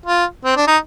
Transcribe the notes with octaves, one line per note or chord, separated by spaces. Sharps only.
F4
C4
D4
D#4